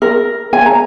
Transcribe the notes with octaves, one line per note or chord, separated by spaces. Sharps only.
A#4
G#5
A#5